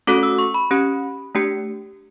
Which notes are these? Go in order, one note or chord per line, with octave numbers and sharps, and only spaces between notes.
A3 C#4 F#4 A4 D6
E6
C#6
B5
C#4 G4
A3 D4 G4